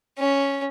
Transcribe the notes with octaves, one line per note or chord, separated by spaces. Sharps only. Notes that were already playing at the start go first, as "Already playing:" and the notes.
C#4